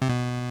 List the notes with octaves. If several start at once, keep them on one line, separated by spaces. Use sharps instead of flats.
C3
B2